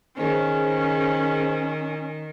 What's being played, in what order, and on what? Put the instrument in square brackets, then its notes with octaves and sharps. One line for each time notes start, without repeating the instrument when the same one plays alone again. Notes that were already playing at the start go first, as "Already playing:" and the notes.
[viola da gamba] D#3 [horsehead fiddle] C#4 [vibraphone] G#4 C5